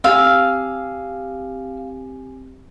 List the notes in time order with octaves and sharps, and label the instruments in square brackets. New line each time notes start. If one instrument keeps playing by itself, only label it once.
[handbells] C4 G4 G#5 [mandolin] F5 E6